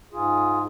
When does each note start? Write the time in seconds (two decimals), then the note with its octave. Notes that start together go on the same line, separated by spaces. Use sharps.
0.12 G#2 F4 G#4